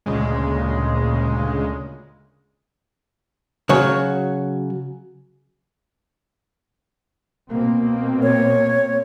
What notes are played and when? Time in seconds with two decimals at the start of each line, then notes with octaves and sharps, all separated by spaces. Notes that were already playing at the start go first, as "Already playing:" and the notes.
0.06 D2 A#2 C#3 G#3
3.69 C#3 F#3 C#5
7.50 B2 A#3 C4
8.23 C#5